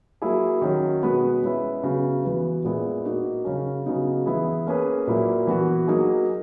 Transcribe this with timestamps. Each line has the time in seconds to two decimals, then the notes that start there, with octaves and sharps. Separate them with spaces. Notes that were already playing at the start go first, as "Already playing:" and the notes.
0.22 F#3 A#3 E4 G#4
0.62 D#3 F#3 C#4
1.02 B2 G#3 B3 F#4 B4
1.42 G#3 C#4 E4 B4
1.83 C#3 F#3 B3
2.24 E3 B3 F#4 B4
2.64 A#2 G#3 B3 E4 G#4
3.05 A#3 D#4 F#4
3.45 C#3 F#3 C#4
3.86 C#3 F#3 B3 D#4
4.26 E3 B3 E4 G#4
4.67 A#3 C#4 G#4 B4
5.07 A#2 F#3 A#3 E4
5.47 E3 B3 F#4
5.88 F#3 A#3 D#4 G#4